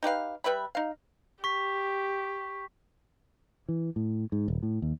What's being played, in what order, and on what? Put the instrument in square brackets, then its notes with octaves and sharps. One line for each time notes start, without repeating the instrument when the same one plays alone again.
[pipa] D#4 G4 B4 F5
G3 B4 E5 B5
D#4 F5
[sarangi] G4 [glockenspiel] C#6 B6
[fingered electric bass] E3
A2
G#2
D#1
A2
D#2